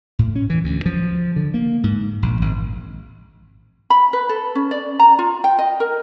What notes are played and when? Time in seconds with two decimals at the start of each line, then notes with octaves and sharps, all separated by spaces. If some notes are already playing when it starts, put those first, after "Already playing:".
0.19 A2
0.36 C#4
0.50 E3
0.64 D2
0.86 F3
1.36 D3
1.54 A#3
1.83 G#2
2.22 A#1
2.41 G#1
3.90 B5
4.13 B4
4.29 A4
4.55 C#4
4.71 D5
4.99 A#5
5.19 F4
5.44 G5
5.59 D#5
5.80 A#4